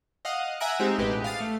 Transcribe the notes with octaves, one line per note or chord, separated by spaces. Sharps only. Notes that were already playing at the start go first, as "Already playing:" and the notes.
D#5 F5 F#5 D#6
E5 F#5 G#5 A#5 F#6 D7
G#3 C4 D#4 G4 E5
A1 B2 G#3 G4 B4
F5 D#6 A6 C7
A3